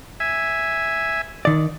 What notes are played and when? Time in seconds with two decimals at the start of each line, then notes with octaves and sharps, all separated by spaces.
0.20 E5 G#5
1.45 D#3 D5